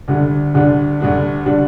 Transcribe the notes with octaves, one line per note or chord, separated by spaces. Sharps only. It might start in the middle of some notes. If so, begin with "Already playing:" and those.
D2 D3 G3 D4
D2 D3 G3 D4
D2 D3 G3 D4
D3 G3 D4